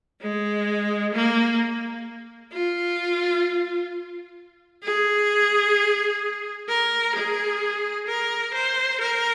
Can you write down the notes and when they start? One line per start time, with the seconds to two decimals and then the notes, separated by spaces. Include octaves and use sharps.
0.22 G#3
1.14 A#3
2.52 F4
4.83 G#4
6.69 A#4
7.15 G#4
8.07 A#4
8.54 C5
9.01 A#4